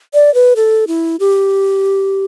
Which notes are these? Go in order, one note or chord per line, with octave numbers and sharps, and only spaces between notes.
D5
B4
A4
E4
G4